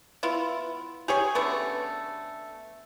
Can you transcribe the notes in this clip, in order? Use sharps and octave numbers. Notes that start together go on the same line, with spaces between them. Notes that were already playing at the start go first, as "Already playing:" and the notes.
B3 E4 F4
G4 G#4 C#5 G#5
D3 A3 B3 C#4